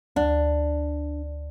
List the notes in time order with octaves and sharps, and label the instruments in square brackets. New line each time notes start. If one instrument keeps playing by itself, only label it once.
[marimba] D2 [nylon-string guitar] D4